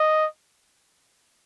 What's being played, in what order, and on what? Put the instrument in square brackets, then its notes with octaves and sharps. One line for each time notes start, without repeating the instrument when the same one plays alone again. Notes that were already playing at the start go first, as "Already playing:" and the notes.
Already playing: [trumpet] D#5